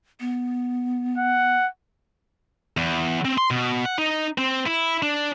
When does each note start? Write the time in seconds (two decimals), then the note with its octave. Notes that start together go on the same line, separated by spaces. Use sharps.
0.20 B3
1.18 F#5
2.77 E2
3.25 C4
3.38 C6
3.51 B2
3.85 F#5
3.98 D#4
4.38 C4
4.67 E4
5.03 D4